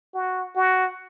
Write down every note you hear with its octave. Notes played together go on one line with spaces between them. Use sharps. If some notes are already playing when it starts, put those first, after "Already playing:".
F#4
F#4